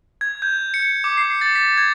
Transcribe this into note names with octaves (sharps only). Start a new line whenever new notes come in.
G#6
G6
C#7
D6
C7
A6
B6
G#6